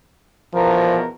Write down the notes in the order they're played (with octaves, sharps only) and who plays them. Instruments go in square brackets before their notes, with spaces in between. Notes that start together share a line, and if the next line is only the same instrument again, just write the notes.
[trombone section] E2 B2 A#4 [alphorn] F3